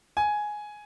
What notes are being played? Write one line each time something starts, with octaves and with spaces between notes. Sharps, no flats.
G#5